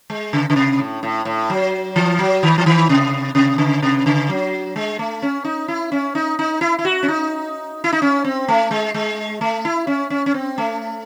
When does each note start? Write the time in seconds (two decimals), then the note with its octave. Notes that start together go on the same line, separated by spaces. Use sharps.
0.10 G#3
0.33 C#3
0.50 C#3
0.56 C3
0.79 A2
1.03 A2
1.25 A2
1.50 F#3
1.96 E3
2.19 F#3
2.43 D#3
2.58 E3
2.66 D#3
2.89 C3
3.35 C3
3.58 C#3
3.82 C3
4.06 C#3
4.29 F#3
4.76 G#3
4.99 A3
5.22 C#4
5.45 D#4
5.68 E4
5.92 C#4
6.15 D#4
6.39 D#4
6.61 E4
6.79 E4
6.85 F#4
7.03 C#4
7.08 D#4
7.84 E4
7.93 D#4
8.02 C#4
8.24 C4
8.48 A3
8.71 G#3
8.94 G#3
9.41 A3
9.65 E4
9.87 C#4
10.10 C#4
10.26 C#4
10.34 C4
10.58 A3